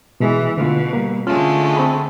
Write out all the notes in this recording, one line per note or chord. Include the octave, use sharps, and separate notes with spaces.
B2 E3 G#3 G#4
B2 D3 A3 F4
G3 A#3
D3 G#3 A3 C#4 F4 F5
C4 A5 B5